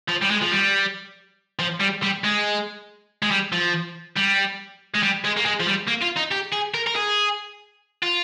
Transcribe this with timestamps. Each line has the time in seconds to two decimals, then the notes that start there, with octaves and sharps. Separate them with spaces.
0.09 F3
0.23 G3
0.31 G#3
0.42 F3
0.52 G3
1.59 F3
1.80 G3
2.03 G3
2.24 G#3
3.22 G#3
3.31 G3
3.53 F3
4.16 G3
4.95 G#3
5.03 G3
5.25 G#3
5.37 A#3
5.46 G#3
5.60 F3
5.67 G3
5.88 A#3
6.02 F4
6.17 D#4
6.32 G4
6.53 G#4
6.74 A#4
6.87 A#4
6.95 G#4
8.03 F4